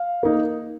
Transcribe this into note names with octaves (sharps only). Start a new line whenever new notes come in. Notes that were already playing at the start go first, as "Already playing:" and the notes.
Already playing: F5
A#3 D#4